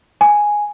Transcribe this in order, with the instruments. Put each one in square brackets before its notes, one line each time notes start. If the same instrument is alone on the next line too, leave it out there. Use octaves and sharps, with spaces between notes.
[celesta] G#5